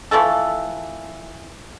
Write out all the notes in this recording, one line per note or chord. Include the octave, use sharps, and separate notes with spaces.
E3 F3 A3 A4